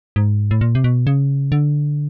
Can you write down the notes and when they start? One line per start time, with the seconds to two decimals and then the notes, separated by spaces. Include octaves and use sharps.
0.16 G#2
0.51 A2
0.61 A#2
0.75 C3
0.84 B2
1.07 C#3
1.52 D3